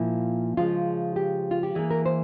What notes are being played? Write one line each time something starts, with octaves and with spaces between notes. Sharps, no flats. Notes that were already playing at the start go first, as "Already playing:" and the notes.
Already playing: A#2 F3 A#3 E4
C#3 F3 G#3 F4
G4
F4
G4
E3 A#3 G#4
A#4
C5